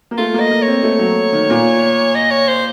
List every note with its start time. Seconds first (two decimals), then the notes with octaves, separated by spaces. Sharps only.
0.11 A#3
0.18 A3 F4
0.34 A#3
0.40 D#5
0.51 A#3
0.62 C#5
0.68 C4
0.83 A3
0.99 F#3
1.33 D#3
1.50 A#2
2.15 D#5
2.31 C#5
2.48 C5